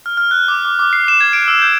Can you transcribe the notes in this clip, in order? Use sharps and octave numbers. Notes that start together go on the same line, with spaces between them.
F6
F6
F#6
D6
D6
D6
C7
E7
G#6
D7
E6
G6